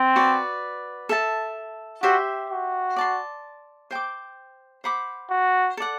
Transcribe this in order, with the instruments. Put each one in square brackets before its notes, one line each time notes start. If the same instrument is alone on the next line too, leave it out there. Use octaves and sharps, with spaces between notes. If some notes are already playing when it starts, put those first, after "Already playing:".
Already playing: [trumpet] C4
[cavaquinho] F#4 B4 D5
A4 E5 A5
[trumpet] F#4 [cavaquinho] G4 C5 E5
[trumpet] F#4
[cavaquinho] D5 A5 C6
C5 G5 D6
C5 F#5 B5 D6
[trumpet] F#4
[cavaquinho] A4 D5 F#5